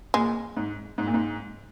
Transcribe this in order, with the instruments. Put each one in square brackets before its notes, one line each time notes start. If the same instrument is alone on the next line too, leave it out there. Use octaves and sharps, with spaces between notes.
[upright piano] A#2 [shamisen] G#3
[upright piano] G#2
G#2
A#2
G#2